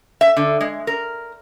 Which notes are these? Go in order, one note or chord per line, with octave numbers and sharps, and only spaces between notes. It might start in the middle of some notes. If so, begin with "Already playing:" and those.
E5
D3
G#3
A#4